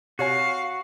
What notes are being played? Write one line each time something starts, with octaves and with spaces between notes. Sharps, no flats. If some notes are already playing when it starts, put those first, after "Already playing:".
C3 F#4 C#5 F5 G#5